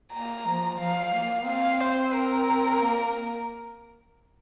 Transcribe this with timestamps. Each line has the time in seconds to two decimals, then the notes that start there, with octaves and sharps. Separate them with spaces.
0.12 A#3 A#5
0.46 F3
0.79 F3 F5
1.13 A#3
1.46 C4 F5
1.81 C5
2.14 A#4
2.81 A#3